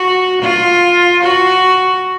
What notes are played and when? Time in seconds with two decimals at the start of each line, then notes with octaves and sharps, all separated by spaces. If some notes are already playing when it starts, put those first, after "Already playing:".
Already playing: F#4
0.42 F4
1.23 F#4